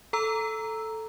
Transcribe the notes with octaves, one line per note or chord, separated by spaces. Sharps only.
A4 A#5 E6